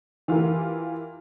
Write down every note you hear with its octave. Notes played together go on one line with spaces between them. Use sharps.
E3 F4 G4 A#4